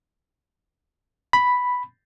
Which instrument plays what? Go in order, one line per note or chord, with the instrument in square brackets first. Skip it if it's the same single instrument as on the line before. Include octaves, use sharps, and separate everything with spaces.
[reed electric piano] B5